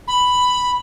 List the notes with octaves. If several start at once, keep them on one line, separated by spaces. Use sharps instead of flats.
B5